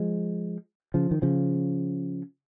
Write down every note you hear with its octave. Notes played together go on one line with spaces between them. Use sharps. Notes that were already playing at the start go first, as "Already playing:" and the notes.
Already playing: F3 G#3
C#3 F3
D#3
C#3 F3